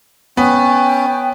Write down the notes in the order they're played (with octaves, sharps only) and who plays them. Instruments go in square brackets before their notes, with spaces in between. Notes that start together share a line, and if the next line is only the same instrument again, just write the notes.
[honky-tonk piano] B3 [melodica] C#4 [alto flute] G5